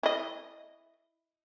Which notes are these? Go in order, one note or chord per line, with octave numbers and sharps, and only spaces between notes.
E4 D#5